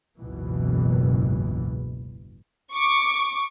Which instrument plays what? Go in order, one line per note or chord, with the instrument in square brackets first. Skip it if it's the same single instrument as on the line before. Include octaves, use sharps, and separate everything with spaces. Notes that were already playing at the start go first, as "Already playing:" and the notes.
[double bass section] F#1 C#2 G#2 B2 E3
[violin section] C#6 D6